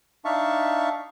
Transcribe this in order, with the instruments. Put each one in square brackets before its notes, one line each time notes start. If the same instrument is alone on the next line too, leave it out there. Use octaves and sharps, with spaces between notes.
[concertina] D4 D#4 E5 F5 A5 C#6